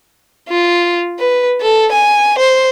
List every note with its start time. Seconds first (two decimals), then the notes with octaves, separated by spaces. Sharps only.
0.49 F4
1.19 B4
1.61 A4
1.92 G#5
2.39 C5